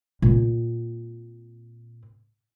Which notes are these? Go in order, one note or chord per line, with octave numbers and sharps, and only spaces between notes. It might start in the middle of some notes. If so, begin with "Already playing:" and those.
A#2 C4